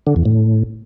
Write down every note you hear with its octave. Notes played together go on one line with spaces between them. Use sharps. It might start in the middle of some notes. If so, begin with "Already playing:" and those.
D3
E2
A2